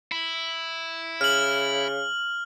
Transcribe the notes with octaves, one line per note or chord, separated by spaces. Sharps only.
E4
C#3 F6 F#7